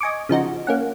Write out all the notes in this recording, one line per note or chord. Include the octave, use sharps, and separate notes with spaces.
D#5 G#5 C#6 D6
C#3 F3 D#4 F#4
A#3 C#4 F#5